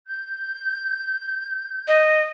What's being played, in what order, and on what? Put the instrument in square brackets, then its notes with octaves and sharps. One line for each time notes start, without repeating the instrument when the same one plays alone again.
[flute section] G6
[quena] D#5